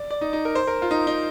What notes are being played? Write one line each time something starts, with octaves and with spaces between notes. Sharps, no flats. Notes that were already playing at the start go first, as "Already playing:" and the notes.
Already playing: D5
D5
D#4
D#4
A#4
C5
A#4
F4
D#4
D#4